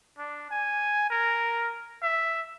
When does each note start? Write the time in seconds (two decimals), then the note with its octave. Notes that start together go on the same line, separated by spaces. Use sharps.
0.18 D4
0.50 G#5
1.10 A#4
2.02 E5